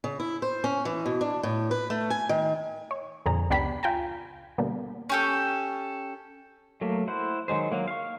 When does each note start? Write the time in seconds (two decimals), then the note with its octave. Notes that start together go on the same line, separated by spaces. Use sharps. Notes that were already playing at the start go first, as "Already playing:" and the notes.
0.04 C#3
0.20 E4
0.42 C5
0.64 C#4
0.85 E3
1.06 B2
1.21 D4
1.43 A2
1.71 B4
1.90 A3
2.10 G#5
2.29 D#3
2.91 C#5
3.26 F2 A#2 D3 C4 G#4 A#5
3.50 C#2 B3 D4 G4 B5 B6
3.83 F4 G5 G#5 A#5
4.58 B2 D3 G3 A#3
5.10 C#4 G4 A4
6.81 F#3 A3 A#3
7.08 E4 C5 F#5
7.48 D#3 F#3 G#3 C5
7.72 F#3 A#3
7.88 F5 C#6